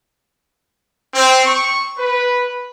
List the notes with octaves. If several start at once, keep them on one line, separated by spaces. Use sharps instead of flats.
C4
C#6
B4